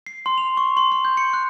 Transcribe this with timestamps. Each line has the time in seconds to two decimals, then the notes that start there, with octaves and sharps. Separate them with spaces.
0.07 C7
0.26 C6
0.38 F7
0.57 C#6
0.77 C6
0.92 C6
1.05 G6
1.17 C#7
1.33 F#6